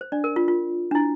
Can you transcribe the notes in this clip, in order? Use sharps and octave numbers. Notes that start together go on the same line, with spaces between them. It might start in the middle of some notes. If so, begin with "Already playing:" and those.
C5
D4 D5
A#4
F4
F4
D4
E4